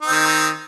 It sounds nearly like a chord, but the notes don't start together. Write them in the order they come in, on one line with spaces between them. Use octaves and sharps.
D#4 C4 D#3